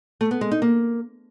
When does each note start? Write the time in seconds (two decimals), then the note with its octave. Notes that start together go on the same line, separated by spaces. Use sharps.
0.21 A3
0.31 B3
0.41 G#3
0.51 D#4
0.62 A#3